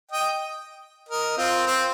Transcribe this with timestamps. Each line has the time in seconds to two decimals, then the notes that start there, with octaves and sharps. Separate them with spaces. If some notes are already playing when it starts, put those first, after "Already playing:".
0.11 D#5 G5
1.09 A#4 D#5
1.37 C4 F4
1.67 C4